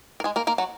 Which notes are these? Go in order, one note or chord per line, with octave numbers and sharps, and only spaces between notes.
A#4
G#3 G#4
A#3 A#4
A#3 A#4
F#3 F#4